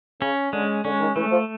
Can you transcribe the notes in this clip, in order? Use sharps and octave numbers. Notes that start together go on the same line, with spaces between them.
C#3 C#4
D3 G#3
D3 C#4
D#3
E3 A3
F3